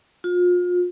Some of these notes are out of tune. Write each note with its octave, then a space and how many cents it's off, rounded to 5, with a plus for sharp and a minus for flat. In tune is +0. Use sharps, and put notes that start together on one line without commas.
F4 +35